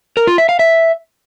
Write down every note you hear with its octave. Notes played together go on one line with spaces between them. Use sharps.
A#4
F4
E5
F5
E5